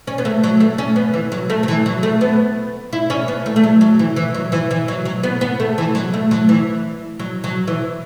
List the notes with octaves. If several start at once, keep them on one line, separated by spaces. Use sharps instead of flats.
C#4
B3
A3
F#3
A3
C#4
B3
E3
F#3
A3
F#3
E3
F#3
A3
B3
E4
C#4
B3
A3
A3
F#3
F#3
E3
E3
F#3
E3
E3
F#3
F#3
B3
B3
A3
E3
F#3
A3
F#3
E3
F#3
F#3
E3